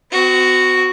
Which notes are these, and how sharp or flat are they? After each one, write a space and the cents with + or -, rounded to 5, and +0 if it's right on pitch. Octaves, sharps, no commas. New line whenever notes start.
C4 -45 F#4 +0